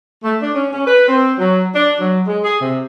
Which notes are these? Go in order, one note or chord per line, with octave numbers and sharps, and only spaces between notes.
A3
D4
C#4
C#4
B4
C4
F#3
D4
F#3
G#3
G#4
C3